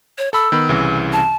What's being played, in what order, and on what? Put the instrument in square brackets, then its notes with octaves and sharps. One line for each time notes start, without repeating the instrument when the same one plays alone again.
[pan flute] C#5
[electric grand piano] A4 B5 [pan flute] E6
[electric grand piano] D#3 B3 B5
C2 C#3 E3
[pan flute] A5